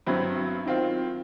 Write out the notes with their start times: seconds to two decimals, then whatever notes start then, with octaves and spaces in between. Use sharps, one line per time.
0.06 G2 F#3 B3 C4 E4
0.66 D#3 C4 F4